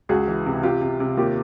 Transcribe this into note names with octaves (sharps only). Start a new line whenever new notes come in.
C#2 F#4 G#4
E3
C3
C3 F4 G4
C3
C3
D#2 F4 G4